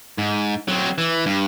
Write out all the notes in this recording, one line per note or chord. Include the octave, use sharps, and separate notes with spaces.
G#2
F#3 C4
E3
G2